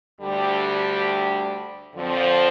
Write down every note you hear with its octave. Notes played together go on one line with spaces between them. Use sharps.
D2 D3 G3 D4 G4
F2 D3 F3 C4